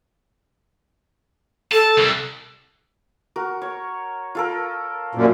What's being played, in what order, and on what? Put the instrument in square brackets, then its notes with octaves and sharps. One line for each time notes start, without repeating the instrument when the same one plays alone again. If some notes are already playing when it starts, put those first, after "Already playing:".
[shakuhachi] A4 [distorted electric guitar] A5
[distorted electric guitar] C2
[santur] F#4 A#4
C#5
F4 A4 A#4
[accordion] F#2 A#2